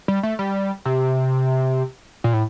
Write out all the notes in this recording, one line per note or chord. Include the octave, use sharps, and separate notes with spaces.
G3
A3
G3
C3
A#2
A2